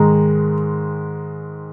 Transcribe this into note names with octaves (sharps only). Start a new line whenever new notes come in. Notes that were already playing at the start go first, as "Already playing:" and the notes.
Already playing: G#2 D#3 G#3 A#5